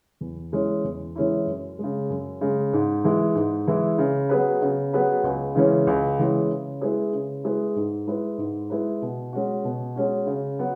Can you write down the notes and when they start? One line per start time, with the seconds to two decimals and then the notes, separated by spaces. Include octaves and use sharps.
0.21 E2
0.52 E3 G#3 C#4 E4
0.84 E2
1.15 E3 G#3 C#4 E4
1.47 F#2
1.79 C#3 G#3
2.10 F#2
2.41 C#3 G#3
2.73 G#2
3.04 E3 G#3 E4
3.35 G#2
3.67 E3 G#3 E4
3.98 C#3
4.29 F#3 B3 G#4 B4
4.62 C#3
4.93 F#3 B3 G#4 B4
5.24 C#2
5.55 C#3 E3 G#3 C#4
5.87 C#2
6.19 C#3 E3 G#3 C#4
6.50 C#3
6.81 G#3 E4 G#4 B4
7.13 C#3
7.44 G#3 E4 G#4 B4
7.76 G#2
8.07 G#3 E4 B4
8.38 G#2
8.70 G#3 E4 B4
9.02 B2
9.33 G#3 C#4 F#4
9.65 B2
9.96 G#3 C#4 F#4
10.27 C#3
10.59 F#3 B3